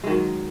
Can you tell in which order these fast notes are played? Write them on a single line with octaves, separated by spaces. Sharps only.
G#3 D#3 F#3